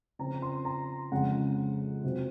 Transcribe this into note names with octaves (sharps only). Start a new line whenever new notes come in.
C#3 F3 C4 A#5
C6
A#5
F2 C#3 G#3 F#5
C3 F#3 C4